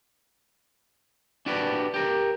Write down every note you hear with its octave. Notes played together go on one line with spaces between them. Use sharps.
D4 F#4 G4 B4 D5
G4 A#4